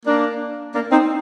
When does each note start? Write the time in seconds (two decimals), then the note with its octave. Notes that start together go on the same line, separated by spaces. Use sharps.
0.06 A#3 D4
0.74 A#3 D4
0.91 C4 D#4